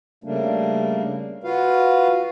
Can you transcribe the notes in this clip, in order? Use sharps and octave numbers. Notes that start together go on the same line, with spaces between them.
C#3 G3 A3 A#3 D4
F4 F#4 B4 F5